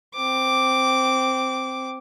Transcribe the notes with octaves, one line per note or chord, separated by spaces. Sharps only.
C4 D6